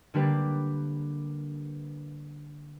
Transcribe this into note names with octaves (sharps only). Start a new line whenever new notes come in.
D3 G3 A#3 D4 G4 B4